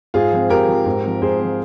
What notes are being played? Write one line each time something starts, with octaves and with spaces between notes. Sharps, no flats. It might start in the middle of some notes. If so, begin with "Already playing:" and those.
G#2 F4 G#4
F3 C4
G#2 G4 A#4
F3 C4
G#2
F3 C4
G#2 G#4 C5
F3 C4